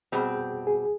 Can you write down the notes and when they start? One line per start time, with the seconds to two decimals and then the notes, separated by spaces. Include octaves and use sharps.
0.12 B2 G3 C4 G#4
0.67 G#4